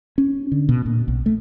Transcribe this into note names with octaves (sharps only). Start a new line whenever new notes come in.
C#4
D3
B2
A#2
B1
A3